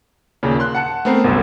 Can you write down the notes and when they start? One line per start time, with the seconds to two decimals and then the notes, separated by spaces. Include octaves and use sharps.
0.43 D#2 A#2 C#3
0.60 C6 F#6
0.75 F#5 A5 C#7
1.05 A3 B3 C4 A#4 C7
1.24 G1 C2 F#2 E6